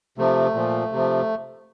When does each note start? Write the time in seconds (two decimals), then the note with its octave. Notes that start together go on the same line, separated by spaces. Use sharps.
0.18 C3 F3 A3
0.55 A#2 F3
0.92 C3 F3